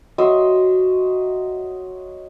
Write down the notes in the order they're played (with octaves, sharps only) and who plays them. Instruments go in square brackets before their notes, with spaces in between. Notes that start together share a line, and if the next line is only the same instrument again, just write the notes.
[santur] F#3 D#5 E5 C6